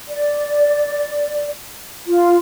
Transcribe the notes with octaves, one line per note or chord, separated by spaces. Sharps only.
D5
F4